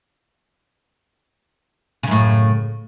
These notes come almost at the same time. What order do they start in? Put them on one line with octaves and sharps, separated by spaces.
C#3 F#2 A2